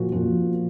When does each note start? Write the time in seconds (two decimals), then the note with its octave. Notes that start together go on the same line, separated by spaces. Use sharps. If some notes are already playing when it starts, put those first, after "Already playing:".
Already playing: A#2 F3 F#4
0.12 A#2 F3